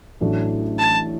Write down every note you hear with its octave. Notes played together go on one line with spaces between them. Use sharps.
A1 A2 F#3 A3 D4
A5